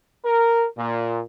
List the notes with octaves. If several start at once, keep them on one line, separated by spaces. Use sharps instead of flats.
A#4
A#2